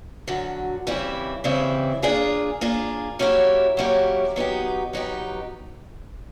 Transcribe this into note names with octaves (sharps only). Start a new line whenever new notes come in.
F#2 D3 F#3
C#3 E3 G3 C4 E4
C#3 E3 G3 C4 E4
A#3 D4 F4 G#4
A#3 D4 F4 G#4
F#3 A#3 C#4 E4 G4
F#3 A#3 C#4 E4 G4
F#3 B3 D#4 G4
F#3 B3 D#4 G4